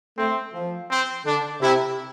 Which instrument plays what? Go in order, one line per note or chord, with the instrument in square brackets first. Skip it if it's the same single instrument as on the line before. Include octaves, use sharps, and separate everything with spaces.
[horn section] A3 [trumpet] C4
[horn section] F3
[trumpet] C4
[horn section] D3 [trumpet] D4
[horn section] C3 [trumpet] E4